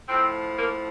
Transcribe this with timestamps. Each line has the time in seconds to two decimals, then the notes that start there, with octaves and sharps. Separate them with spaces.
0.08 A2 F3 C4
0.57 A#3